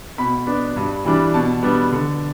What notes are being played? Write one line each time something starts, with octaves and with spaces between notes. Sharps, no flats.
B2 B5
B3 D4
G2
E3 G3 D4
B2 A5
G3 B3 D4
D3